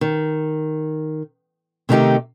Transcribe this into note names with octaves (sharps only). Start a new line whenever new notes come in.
D#3
C3 D#3 A3 D#4 G4